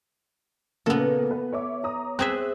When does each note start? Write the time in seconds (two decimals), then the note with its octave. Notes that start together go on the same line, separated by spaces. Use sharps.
0.86 A#2 C#3 A#3 B3 A4
1.31 B4
1.53 C#5 E5 D6
1.83 C#5 A#5 D#6
2.19 C4 G#4 E5 F#6